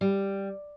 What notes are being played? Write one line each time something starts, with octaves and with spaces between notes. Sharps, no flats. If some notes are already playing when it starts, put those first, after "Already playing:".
G3